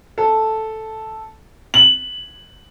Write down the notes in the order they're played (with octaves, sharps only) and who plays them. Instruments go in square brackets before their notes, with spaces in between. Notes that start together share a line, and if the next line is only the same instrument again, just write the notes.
[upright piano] A4
F#7